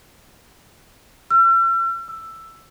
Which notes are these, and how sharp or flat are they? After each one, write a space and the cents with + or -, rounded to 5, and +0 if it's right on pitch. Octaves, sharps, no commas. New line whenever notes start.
E6 +45
E6 +10